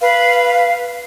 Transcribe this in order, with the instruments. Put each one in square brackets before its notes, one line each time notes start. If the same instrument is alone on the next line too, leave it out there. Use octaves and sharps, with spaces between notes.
[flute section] B4 F5